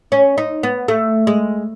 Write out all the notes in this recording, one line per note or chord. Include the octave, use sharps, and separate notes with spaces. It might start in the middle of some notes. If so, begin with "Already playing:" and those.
C#4
D#4
B3
A3
G#3